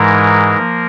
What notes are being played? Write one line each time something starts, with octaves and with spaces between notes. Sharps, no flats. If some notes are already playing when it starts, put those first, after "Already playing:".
Already playing: G#2 E3 G#3 A#4
F3 A#3